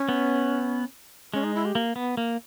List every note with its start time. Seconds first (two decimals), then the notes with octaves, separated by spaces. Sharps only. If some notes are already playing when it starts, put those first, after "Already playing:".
Already playing: C#4
0.09 B3
1.34 G#3 C#4
1.44 D#4
1.55 E4
1.65 G4
1.75 A#3
1.96 B3
2.17 A#3